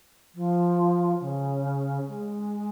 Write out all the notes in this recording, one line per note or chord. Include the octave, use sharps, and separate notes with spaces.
F3
C#3
G#3